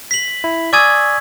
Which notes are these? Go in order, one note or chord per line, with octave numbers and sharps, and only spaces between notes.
B6 F#7
E4
D5 G#5 C#6 D#6 E6 G#6